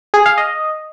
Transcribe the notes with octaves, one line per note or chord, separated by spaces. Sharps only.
G#4
F5
D#5